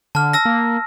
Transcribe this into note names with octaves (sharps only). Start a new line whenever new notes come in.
D3 A5 F6
A5 E6 A#6
A#3